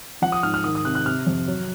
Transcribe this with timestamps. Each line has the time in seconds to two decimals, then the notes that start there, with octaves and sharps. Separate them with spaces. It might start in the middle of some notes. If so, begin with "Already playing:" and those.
0.22 F3 F#5
0.32 D#6
0.43 G#2 F6
0.54 F6
0.64 D#3 D#6
0.75 D#6
0.85 C3 F#6
0.95 F#6
1.06 C3 F6
1.27 F2
1.48 F#3